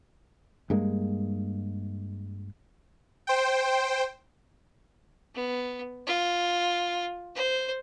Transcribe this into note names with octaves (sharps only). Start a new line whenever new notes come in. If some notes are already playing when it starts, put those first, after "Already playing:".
G2 G#3 A#3
C5 G5
B3
F4
C5